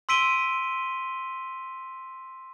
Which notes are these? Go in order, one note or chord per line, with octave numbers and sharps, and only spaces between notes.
C6 E6 B6 D7 D#7 G7